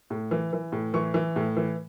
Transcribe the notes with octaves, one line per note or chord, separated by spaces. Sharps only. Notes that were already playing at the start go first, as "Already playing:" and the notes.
A2
E3
E3
A2
E3 C#6
E3
A2
E3